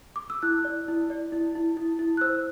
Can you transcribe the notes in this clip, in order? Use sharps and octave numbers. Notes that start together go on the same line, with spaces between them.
D6
E6
E4 F#6
D5
E4
D5
E4
E4
E4
E4
F#6
C5 E6